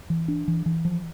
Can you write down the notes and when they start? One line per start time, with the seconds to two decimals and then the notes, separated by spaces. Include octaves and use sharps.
0.10 E3
0.28 D4
0.48 E3
0.66 E3
0.85 F3